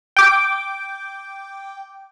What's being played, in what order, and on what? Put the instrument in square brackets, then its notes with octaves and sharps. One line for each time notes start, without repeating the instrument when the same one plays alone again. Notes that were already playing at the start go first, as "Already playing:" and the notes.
[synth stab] G5 D6